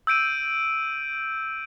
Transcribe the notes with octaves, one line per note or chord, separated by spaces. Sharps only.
E6 G6 D7 D#7